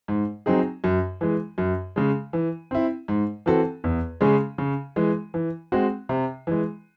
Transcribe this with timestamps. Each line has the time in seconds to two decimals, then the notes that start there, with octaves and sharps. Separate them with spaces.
0.08 G#2
0.46 F#3 C4 D#4 G#4
0.84 F#2
1.21 E3 G#3
1.58 F#2
1.96 C#3 G#3
2.33 E3
2.71 C4 E4
3.08 G#2
3.46 E3 C4 F#4 A4
3.84 E2
4.21 C#3 G#3 C#4 G#4
4.58 C#3
4.96 E3 G#3
5.34 E3
5.72 G#3 C4 F#4
6.09 C3
6.47 E3 G#3